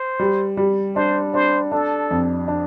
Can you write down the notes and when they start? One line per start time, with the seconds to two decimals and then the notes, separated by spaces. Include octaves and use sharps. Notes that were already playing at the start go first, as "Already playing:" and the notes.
Already playing: C5
0.20 G3
0.57 G3
0.95 D4 C5
1.34 D4 C5
1.72 D4 A4
2.11 F2
2.48 D4